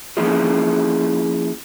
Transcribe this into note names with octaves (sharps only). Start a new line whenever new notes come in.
F3 A#3 C#4 E4 F4 G#4